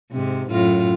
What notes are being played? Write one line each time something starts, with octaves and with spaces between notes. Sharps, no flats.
G#2 C3
F#2 A2 F4